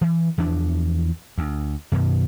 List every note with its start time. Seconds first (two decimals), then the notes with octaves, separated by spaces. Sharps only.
0.01 E3
0.38 E2 E3 F3 D4
1.38 D2
1.92 F#2 B2 D#3